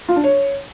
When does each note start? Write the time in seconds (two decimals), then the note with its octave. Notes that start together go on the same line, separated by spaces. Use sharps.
0.09 F4
0.16 D4
0.24 C#5